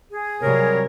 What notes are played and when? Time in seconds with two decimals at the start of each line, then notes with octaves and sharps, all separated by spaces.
0.12 G#4
0.42 C3 F#3 G3 A#4 C#5